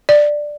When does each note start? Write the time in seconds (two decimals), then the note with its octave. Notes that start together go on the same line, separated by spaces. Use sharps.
0.09 D5